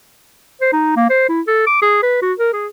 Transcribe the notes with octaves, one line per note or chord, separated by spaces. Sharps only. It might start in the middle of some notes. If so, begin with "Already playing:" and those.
C5
D#4
A#3
C5
E4
A4
D6
G#4
B4
F#4
A#4
G#4